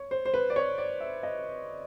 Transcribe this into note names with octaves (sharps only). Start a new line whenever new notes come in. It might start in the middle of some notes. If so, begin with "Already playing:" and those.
Already playing: C#5
C5
C5
B4
D5
C#5
D5
E5
D#5